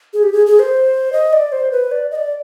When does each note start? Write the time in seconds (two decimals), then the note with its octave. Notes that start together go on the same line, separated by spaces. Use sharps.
0.14 G#4
0.23 G4
0.33 G#4
0.46 G#4
0.59 C5
1.13 D#5
1.33 D5
1.52 C5
1.72 B4
1.91 D5
2.11 D#5
2.15 D5